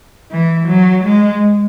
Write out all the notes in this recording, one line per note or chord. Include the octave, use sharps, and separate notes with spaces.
E3
F#3
G#3